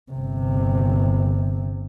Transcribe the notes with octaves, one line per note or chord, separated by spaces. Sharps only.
G1 C3